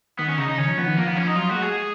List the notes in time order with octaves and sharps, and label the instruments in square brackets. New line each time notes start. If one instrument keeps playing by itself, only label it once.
[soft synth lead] D#3 [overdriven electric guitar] B3
[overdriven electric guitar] C#4
[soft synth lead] C#3 [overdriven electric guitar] D#4
[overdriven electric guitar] D#4
[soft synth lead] D#3 [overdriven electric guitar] C#4
[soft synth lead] F3
[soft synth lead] F3 [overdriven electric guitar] B3
[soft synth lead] D#3
[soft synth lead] F3 [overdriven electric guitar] A#3
[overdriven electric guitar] B3
[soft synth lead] F3 [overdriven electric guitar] C#4
[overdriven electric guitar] D#4
[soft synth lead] F#3 [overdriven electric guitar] F4
[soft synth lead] A#3 [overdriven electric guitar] F#4
[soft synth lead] G#3
[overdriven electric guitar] G#4